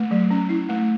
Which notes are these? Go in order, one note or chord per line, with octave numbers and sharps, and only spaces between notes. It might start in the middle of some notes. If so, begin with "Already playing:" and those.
Already playing: A3
F#3
C#4
E4
A3